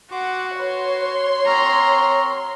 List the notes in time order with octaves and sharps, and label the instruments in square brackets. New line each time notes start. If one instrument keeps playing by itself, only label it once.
[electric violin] F#4 [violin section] F#5 [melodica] C6 D6
[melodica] B4 [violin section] C#5 C6
[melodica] C4 F#4 A#4 [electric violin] A#5